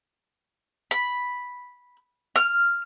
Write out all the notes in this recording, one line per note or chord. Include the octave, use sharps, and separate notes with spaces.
B5
F6